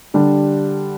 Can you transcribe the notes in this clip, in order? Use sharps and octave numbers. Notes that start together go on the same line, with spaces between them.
D3 G3 D4 G4